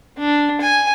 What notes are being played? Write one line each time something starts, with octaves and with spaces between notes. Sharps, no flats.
D4
G#5